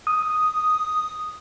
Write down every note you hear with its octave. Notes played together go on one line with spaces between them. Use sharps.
D#6